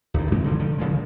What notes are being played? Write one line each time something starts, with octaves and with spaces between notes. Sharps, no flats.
D2 G2
F#2 F#3 G#3 C4
D1 G2 D3 F3
D3 D#3 F3
E1 C#3 F3 G#3